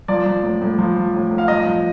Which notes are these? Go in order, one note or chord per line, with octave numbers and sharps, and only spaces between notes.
F3 D5
F3
A2
A2
F3
F3
A2
A2
F5
F3 D#5
F3